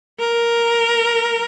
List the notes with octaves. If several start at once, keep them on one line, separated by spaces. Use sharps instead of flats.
A#4